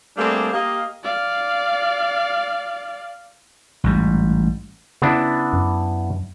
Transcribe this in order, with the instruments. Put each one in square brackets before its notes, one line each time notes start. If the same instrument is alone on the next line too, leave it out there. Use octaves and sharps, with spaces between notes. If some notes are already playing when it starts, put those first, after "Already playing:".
[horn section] G3 A3 A#3 C4 D4 G#4
A#3 G4 D#5 F5
[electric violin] D5 F5
[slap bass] A1 G#2 G3
[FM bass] C#3 [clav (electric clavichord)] B3 D4 E4
[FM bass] F#2